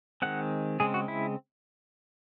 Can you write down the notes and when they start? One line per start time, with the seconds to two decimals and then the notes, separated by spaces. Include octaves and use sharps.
0.22 D#3 G#3 C4 F#5
0.80 C#3 G#3 C4 G#4
0.94 F#4
1.08 E4